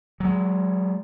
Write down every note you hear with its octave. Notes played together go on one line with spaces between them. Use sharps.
F#3 G#3